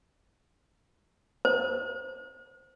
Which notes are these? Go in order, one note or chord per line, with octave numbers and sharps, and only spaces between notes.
C5